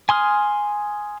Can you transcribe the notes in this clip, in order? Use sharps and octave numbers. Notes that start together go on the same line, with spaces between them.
G#5 C6 D#6 F6